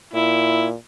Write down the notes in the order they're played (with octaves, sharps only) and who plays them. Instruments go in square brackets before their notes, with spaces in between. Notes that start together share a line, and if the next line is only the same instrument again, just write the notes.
[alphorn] A#2 [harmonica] E4